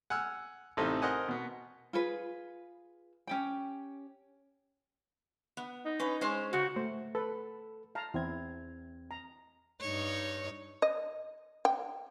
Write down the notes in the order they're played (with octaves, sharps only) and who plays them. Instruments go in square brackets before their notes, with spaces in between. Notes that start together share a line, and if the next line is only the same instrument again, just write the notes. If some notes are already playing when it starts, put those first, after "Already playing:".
[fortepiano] F#5 G#5 E6 F6
A1 C3 D#4 A4 C5
A#4 C5 D#5 F#5 G#5
B2 B3
[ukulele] F4 G#4 B4
C#4 G4 G5
[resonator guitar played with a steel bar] B3
[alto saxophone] D#4
[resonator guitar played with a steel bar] C#4 B4
G#3 C#4 C5
[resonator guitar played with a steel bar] C#3 [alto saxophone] F#4
[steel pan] A3 [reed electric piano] C5
[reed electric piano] A4 [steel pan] B4
[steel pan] F5 A5 A#5
[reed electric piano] E2 C4 G#6 [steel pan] E4
[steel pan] A#5
[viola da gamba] G2 D#4 C#5
[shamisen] D#5
G5